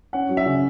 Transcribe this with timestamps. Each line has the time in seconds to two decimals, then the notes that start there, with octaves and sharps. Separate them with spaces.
0.13 C#4 F#5
0.29 F#3
0.37 E5
0.46 C#3